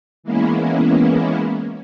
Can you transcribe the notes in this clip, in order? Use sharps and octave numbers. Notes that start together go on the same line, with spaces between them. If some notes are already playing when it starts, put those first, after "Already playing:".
E3 G#3 A#3 B3 C#4 E4